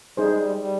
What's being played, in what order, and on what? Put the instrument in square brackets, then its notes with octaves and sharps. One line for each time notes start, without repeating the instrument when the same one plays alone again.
[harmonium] G3 [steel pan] D#4 G#4 C5
[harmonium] G#3
G3
G3